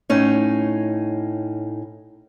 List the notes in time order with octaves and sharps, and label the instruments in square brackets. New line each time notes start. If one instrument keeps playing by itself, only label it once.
[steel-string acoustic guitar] A2 C#4 D#4